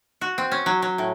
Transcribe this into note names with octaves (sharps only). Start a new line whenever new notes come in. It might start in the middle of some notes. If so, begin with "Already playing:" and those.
F#4
C4
C#4
F#3
F#3
A2